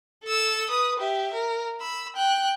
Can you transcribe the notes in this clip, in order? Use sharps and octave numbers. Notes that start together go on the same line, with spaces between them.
A4 E6
B4 D#6
G4 E5
A#4
B5 E6
G5 F#6